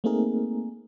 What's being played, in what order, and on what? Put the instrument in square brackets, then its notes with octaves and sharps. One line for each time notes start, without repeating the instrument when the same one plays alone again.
[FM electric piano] A3 A#3 C4 D#4 G#4 A#4